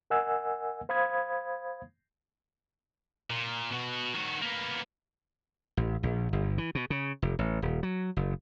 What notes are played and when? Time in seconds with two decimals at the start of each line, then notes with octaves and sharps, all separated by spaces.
0.10 A#4 D#5 F#5 G#5 E6
0.89 C5 F5 B5 D#6 G#6
3.30 A#2
3.71 B2 F#4
4.14 D#3 F#4
4.42 A#3 B3
5.77 A1
6.03 A#1
6.33 G1
6.58 E3
6.75 B2
6.90 C#3
7.22 F1
7.39 A1
7.62 D#1
7.83 F#3
8.17 F#1